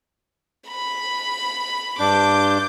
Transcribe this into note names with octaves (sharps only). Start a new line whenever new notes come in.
B5
G2 D4 D6 G6